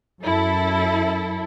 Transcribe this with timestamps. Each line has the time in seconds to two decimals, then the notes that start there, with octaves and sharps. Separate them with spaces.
0.24 F#2 E4 A4